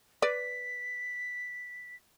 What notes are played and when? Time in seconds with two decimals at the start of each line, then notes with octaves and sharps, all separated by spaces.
0.22 B4 D5 B6